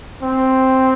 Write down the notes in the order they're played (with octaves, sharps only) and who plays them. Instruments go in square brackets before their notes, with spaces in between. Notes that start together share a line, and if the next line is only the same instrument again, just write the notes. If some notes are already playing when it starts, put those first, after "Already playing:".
[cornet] C4